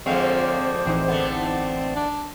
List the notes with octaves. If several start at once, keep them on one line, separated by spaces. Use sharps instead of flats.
F2 D3 G#3 C4 C5 C#5 F5
A1 E3 C4 D#4
D3 A3 B3
D4